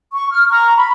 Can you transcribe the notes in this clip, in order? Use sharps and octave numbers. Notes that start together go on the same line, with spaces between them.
C#6
F6
A#5 C#6
B5